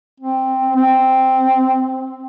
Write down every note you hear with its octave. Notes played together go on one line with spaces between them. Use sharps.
C4
C4